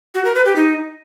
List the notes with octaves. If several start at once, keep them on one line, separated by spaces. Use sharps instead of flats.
F#4
A#4
B4
G4
D#4